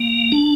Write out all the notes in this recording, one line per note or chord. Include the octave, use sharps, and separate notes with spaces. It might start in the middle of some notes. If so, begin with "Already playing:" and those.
Already playing: A#3
D4